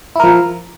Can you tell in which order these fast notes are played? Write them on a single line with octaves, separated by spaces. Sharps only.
E4 A#4 F3